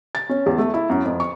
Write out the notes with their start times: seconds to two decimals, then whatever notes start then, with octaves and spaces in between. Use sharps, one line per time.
0.15 A6
0.29 C#4
0.46 E2
0.58 A3
0.74 E4
0.90 F#2
1.05 F2
1.20 C#6